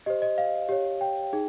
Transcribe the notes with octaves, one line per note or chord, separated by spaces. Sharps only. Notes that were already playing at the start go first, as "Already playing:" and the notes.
G4 C5 D#5
D#5
F5
G4 C#5
G5
D#4 G#4